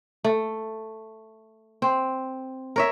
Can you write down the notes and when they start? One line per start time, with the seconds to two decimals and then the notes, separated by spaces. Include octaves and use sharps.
0.24 A3
1.82 C4
2.76 A#4 C#5 E5